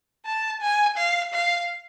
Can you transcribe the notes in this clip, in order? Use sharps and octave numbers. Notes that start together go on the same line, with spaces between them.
A5
G#5
F5
F5